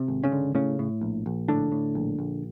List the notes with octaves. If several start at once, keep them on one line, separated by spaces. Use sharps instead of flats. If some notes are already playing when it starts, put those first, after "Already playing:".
Already playing: C3
G#1
C#3 C#4
D3
A2 C#3 C#4
A2
A#1
A#1
A2 D3 D4
A2
A#1
A#1